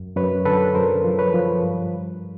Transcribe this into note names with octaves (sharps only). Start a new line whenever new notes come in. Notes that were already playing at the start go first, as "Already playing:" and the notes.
Already playing: F#2
F#2 B4 C#5
D3 A4 B4
F#2 A#4 C5
F3
B4 C#5
F3
G2